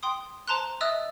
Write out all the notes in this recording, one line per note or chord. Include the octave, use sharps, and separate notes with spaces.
G5 C6 D#6
C5 A5 A#5 C6 F#6
D#5 E5 D#6 E6 F#6 A6